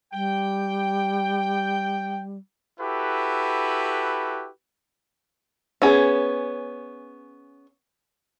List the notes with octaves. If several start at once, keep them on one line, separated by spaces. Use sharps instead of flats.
G3 G5
E4 F#4 G4 A4 B4
B3 C#4 G#4